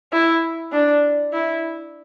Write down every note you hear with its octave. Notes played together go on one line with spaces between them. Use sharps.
E4
D4
E4